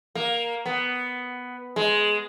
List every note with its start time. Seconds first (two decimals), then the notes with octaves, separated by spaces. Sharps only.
0.15 A#3
0.66 B3
1.76 G#3